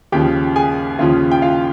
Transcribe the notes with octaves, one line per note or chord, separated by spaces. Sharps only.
D#2 C#3 F3 G4 G5
G#4 G#5
D#2 C#3 F3 F4 F5
G5
F4 F5